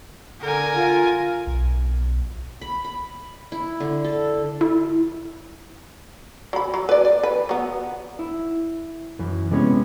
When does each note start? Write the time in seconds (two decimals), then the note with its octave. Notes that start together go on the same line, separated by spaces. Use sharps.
0.41 D3 A#4 G#5
0.76 F4
1.47 B1
2.61 B5
2.85 B5
3.52 E4
3.80 D3
4.05 A4
4.61 E4
6.53 F#3 B5
6.74 F#3
6.89 B4 D5
7.05 D5
7.23 B4
7.49 F#3 B3
8.19 E4
9.19 F#2 E3
9.51 C3 G#3 B3 C#4